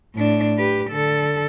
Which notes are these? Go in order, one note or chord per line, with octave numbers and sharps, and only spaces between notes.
A2 D4
G4 B4
D3 A4